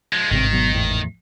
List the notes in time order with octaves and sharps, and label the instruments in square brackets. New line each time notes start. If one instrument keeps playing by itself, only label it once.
[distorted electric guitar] F3 G#3
[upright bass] G#1 [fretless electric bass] G2 C3 C4 [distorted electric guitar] D#3
[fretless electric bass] B2 F#3 B3
E2 A2